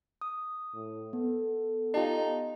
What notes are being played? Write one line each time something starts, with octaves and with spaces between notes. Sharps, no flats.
D#6
A2
B3 A4
D#4 F4 G4 A5